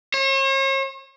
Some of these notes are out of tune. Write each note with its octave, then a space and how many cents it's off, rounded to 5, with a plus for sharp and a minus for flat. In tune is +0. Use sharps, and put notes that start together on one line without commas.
C#5 -45